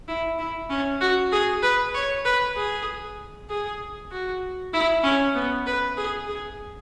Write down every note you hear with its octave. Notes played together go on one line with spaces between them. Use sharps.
E4
E4
C#4
F#4
G#4
B4
C#5
B4
G#4
G#4
F#4
E4
C#4
B3
B4
G#4
G#4